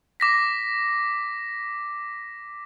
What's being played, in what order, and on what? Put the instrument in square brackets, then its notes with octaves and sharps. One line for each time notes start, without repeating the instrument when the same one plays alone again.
[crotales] D6 A#6 B6